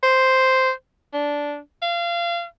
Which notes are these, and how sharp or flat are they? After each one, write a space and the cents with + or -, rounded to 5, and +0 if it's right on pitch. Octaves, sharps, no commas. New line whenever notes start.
C5 -5
D4 -10
F5 -25